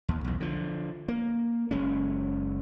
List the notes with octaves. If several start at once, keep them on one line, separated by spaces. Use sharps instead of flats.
D#2
B1 E2
D3 F3
A#3
F#1 G#3 C#4